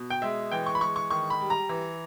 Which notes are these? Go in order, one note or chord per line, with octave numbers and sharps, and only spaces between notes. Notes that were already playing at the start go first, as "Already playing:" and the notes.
Already playing: B2
G5
G#3 E5
E3 G5
C#6
B5
G#3 C#6
C#6
D#3 C#6
B5
G3
A#5
E3